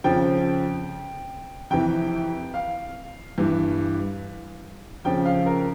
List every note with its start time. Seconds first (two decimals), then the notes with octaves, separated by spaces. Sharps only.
0.04 F2 C#3 F3 G5
1.70 F2 C3 E3 G5
2.54 F5
3.38 G2 E3
5.04 F2 C#3 F3 G5
5.25 F5
5.46 A#4